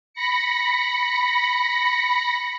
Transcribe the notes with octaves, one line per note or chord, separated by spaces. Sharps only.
B5 A#6 C#7